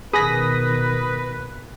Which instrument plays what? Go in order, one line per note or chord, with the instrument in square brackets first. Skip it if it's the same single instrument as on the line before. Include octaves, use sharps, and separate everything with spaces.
[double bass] B2 D#3 [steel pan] G#4 B5 [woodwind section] B4 [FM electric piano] D#6 A#6 B6